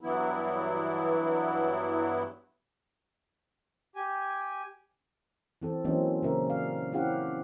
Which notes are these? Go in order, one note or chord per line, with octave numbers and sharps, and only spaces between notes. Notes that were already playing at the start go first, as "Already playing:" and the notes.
G2 E3 F#3 B3 E4
G4 G#5
E3 C4 A4
E3 F#3 A#3 C4 C#4 D#4
A#2 C#3 C#4 A#4 E5
D5 F5
C4 C#4 E4 G4 F5 F#5